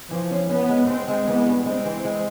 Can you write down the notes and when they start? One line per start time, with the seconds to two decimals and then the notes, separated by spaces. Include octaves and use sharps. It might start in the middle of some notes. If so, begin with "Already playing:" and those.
0.11 E3 F3
0.31 C#4
0.49 B3 C#4
0.69 G#3
0.88 G#3 C4
1.08 G#3
1.27 E3 B3
1.46 G2
1.66 G#3 C4
1.85 E3
2.05 G#3